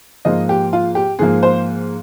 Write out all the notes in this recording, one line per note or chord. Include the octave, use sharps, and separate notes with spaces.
G#2 F3 A#3 D#5
G4
F4
G4
G#2 F3 A#3 G#4
C5